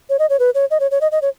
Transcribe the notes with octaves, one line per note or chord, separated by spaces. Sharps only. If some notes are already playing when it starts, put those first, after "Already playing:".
C#5
D#5
C#5
B4
C#5
D#5
C#5
C#5
D#5
D#5
C#5